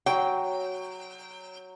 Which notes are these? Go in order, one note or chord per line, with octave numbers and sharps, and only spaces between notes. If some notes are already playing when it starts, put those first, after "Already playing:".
F#3 G5